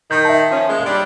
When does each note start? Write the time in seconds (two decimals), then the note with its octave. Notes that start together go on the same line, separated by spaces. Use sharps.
0.11 D#3 D#4 G6
0.25 E5 A5
0.50 F3 C#4
0.69 G#3 A#3
0.86 G3 D4